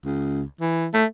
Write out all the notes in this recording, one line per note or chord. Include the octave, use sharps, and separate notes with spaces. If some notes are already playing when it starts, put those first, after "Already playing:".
C#2
E3
A3